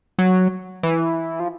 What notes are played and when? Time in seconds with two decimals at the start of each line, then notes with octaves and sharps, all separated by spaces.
0.19 F#3
0.83 E3
1.40 F3